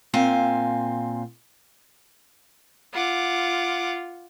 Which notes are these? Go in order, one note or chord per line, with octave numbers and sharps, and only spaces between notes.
A#2 C4 F5 G#5
F4 F#5 D6